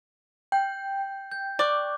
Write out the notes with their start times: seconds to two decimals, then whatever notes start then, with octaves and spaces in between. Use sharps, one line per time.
0.52 G5 G6
1.32 G6
1.59 D5 C#6 D6 F#6